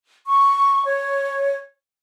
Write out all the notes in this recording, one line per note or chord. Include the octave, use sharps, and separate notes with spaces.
C#6
C#5